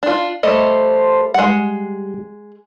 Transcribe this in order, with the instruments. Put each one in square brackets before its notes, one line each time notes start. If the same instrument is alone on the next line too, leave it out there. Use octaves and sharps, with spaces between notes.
[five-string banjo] D4 F4
[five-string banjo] G3 A3 D#5 [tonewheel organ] A4 C5
[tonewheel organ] G3 [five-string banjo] G#3 F#5